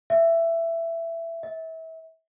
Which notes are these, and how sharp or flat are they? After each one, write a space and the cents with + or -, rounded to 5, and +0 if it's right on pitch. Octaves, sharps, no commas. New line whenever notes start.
E5 +15
E5 -30